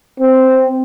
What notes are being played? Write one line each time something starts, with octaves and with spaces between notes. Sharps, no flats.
C4